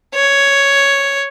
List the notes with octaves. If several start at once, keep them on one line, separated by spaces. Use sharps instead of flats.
C#5